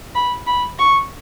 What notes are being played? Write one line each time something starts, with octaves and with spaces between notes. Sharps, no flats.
B5
B5
C#6